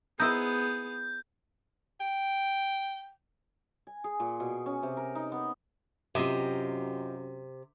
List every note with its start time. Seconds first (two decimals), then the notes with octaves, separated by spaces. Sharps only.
0.20 B3 D#4 E4 G#4 C5 G6
2.00 G5
3.87 G#5
4.04 G#4
4.20 A#2
4.40 B2
4.66 C#4
4.83 C3
4.97 A#4
5.15 D#4
5.32 B3
6.15 F#2 C3 F4 G4 D#5